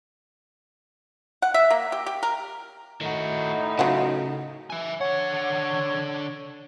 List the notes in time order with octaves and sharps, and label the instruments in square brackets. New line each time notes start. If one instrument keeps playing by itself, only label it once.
[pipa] F#5
E5
A#3
G4
G4
A#4
[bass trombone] A2 [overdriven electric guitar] D#3 F#4 [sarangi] D#4
[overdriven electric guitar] C#3 [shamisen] F#3 F4 F#5
[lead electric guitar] E5 G#5
[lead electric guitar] D3 F#5 [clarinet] C#5